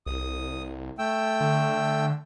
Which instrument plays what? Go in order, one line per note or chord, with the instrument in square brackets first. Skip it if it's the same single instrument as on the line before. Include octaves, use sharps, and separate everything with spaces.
[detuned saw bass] C2 [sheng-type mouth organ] D#6
[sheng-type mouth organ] A3 G5 E6
[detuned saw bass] D3